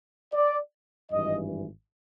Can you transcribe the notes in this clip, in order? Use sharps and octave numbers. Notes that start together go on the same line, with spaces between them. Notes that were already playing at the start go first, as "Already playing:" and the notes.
D5
G#1 G2 E3 D#5